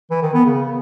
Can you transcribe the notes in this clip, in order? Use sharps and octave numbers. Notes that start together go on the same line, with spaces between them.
E3
D#3
B3
C#3